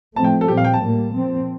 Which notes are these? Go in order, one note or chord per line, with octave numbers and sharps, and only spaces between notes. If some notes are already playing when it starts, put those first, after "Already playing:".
A2 F3 A3 C4 A5
G5
A4
A#2 G3 C4 G4
F5
G5
A5
A2 G3 A#3
A#2 F3 C4